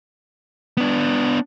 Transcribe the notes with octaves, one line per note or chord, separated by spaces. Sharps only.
B3 D4